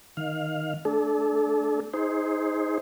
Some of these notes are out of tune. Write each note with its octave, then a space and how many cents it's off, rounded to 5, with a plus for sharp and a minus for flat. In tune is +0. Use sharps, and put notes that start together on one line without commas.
D#3 +0 F5 +15
A3 -10 D4 +0 A4 -30
D#4 +20 G#4 +0 C5 +0